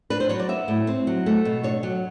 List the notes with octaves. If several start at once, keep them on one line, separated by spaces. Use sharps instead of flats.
D4 B4
C5
F#3 C#5
D5
B3 E5
A2
C4
F#3
A3
B2
D4 C#5
F#3